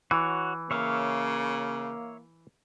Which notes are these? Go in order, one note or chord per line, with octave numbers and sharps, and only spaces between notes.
E3 F#4 C#5
C#3 A#3 C#5 E5 F5